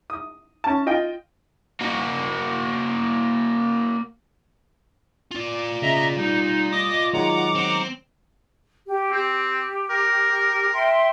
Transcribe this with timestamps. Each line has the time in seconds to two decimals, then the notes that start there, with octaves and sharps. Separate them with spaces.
0.10 D#6
0.64 C#4 A5
0.86 F4 D#5 G5
1.81 A#3 F#4
5.32 F4 D5
5.82 C#3 D#5 E5 A#5
6.17 G3 D#4
6.72 D#5 D6 D#6
7.13 D#3 F#3 G#3 F#5 A#5 D6
7.55 C4
8.87 G4
9.12 C4 G4
9.90 A#4
10.74 E5 G5 C6